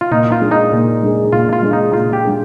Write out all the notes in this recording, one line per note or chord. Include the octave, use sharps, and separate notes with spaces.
F4
A#2 D#4
F4
G#3 D4 G#4
D#4
A#2
G#3 D4 G#4
A#2 F4
F4
G#3 D4 G#4
D#4
A#2 F4
G4
G#3 D4 G#4